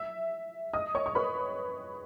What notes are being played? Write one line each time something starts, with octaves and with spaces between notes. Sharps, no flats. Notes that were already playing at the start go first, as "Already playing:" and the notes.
Already playing: E5 E6
D#5 D#6
C#5 C#6
C#6
B4 B5